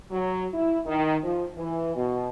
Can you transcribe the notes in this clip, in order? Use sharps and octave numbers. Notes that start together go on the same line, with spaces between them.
F#3
E4
D#3
F3
E3
B2